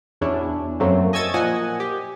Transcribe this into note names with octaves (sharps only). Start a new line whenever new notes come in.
E2 B2 C#4 D4 E4
F#2 F#3 A3 A#3 C4
D#5 G#5 C#6 E6 G#6 A6
A#2 F3 D#5 F#5 G#5
G4